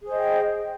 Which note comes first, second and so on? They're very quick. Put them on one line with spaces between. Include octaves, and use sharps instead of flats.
G#4 C5 D#5 G5